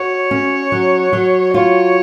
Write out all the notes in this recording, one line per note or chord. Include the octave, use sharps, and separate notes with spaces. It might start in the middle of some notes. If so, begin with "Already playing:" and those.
Already playing: F#4 C#5
C#4
F#3
F#3
F4 C#5